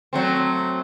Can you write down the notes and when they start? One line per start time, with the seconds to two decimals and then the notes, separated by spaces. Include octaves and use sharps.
0.13 F#3 A3 C4